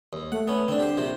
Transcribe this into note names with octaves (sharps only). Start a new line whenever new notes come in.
D#2
A3 F#5
B3 C#4
D3 C4 D4
G4 C5
A#1 C3 C5